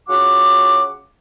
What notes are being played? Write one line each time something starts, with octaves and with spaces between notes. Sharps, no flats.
C#3 F4 F#4 F#5 C#6 D6